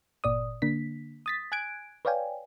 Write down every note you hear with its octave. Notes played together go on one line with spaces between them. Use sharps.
G1 A#2 D5 D#6
D3 A#3 D4 B6
D#6 A6 B6
G#5 F#6 G#6 D7
B4 C#5 D5 F5 G5 G#5